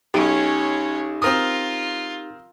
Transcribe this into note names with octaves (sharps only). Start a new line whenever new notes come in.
B1 C#4 D#4 G4 C#5
C4 F4 A#4 D#6